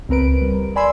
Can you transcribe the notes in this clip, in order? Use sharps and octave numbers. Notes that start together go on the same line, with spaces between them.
C#2 C4 A#4 B4 D7
G3
D5 G#5 B5 C6 E6